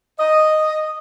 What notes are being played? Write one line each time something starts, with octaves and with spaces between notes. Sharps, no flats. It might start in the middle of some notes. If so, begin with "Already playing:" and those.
D#5